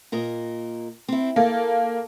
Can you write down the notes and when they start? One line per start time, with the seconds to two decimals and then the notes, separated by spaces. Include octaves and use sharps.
0.12 A#2 A#4 D#5
1.08 C4 E4
1.36 A#3 A4